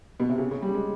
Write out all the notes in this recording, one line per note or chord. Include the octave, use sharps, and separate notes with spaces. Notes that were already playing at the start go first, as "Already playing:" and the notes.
B2
C3
C#3
C#3
G3
G#3